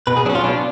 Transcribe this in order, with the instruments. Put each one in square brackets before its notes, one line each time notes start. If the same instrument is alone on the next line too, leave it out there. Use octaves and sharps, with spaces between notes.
[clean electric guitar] B2 B4
G#4
F#3 D4
C#4
F4
B2 D4